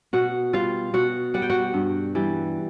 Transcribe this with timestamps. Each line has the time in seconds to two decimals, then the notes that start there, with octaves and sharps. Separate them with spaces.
0.13 B2 F#4 F#5
0.53 G3 F4 F5
0.94 B2 F#4 F#5
1.34 G3 F#5
1.42 G5
1.50 F#4 F#5
1.74 G2
2.15 E3 G3